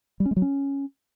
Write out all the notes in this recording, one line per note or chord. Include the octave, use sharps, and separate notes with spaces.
G3
C#4
G#3
F#3
C#4